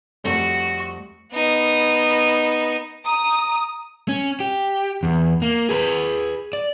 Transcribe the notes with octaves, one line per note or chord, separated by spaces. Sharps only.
F2 G3 A3 F#4
B3 D#4
A#5 D#6
C#4
G4
E2
A#3
G#4 B4
D5